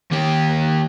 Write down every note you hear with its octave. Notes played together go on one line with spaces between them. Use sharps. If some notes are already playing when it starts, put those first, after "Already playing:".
D#2 G4